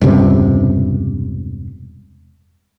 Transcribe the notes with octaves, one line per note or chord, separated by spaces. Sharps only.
E1 C#2 G2 C3